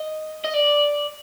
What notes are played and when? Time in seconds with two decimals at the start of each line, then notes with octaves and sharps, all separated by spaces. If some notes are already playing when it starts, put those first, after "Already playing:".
Already playing: D#5
0.45 D#5
0.54 D5